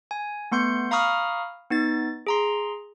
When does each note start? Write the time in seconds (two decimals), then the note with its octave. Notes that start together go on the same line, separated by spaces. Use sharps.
0.11 G#5
0.52 A3 B3 C6 G6 C#7
0.91 F5 A#5 B5 C#6 D#6 F6
1.70 B3 D#4 A6
2.27 G#4 A#5 C6